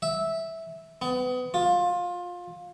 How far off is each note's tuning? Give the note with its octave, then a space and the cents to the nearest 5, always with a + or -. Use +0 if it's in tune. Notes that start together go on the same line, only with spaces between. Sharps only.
E5 -10
B3 +30
F4 +20